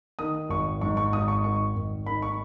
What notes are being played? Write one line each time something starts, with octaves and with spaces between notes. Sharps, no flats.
D#3 D#6
G#1 C#6
G#2 C#6
C#6
G#1 D#6
C#6
D#3 C#6
G#1
D#3 B5
C#6